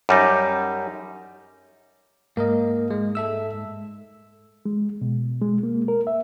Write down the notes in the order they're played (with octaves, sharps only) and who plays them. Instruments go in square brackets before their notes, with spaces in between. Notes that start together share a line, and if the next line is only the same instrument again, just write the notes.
[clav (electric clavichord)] F#2 G3 D#4
[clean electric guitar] G#2 [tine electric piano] A#3 A#4 D#5
[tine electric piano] G#3
A4 E5 E6
[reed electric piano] G#3
B2
G#3
A#3
A#4
E5